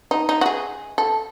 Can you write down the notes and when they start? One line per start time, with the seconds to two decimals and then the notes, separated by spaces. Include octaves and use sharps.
0.11 D#4
0.29 D#4
0.41 F#4
0.46 G#4
0.98 A4